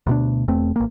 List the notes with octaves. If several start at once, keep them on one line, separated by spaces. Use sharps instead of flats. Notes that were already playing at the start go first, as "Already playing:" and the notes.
D2 B2 D4
E1 E2 A3 C4
A1 A#3